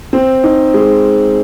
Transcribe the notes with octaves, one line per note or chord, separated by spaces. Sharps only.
C4
D#4
G#3